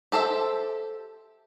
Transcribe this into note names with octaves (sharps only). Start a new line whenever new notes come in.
G4 A4 C5 E5